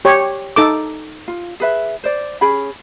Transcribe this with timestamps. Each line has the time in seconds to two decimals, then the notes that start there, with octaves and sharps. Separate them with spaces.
0.05 G4 C#5
0.56 D#4 A4 D6
1.28 F4
1.60 G#4 B4 E5
2.04 C5 D5
2.41 C#4 G#4 B5